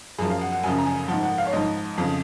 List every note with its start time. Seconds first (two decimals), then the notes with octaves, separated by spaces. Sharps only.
0.18 F#2 F3 G#4
0.30 F5
0.41 F#5
0.52 F#5
0.63 F#2 C#3 F3 G#5
0.78 A#5
0.86 G#5
1.08 G#2 F3 F#5
1.23 F#5
1.38 F5
1.46 C#5
1.53 G#2 F3 D#5
1.97 F2 C#3 F3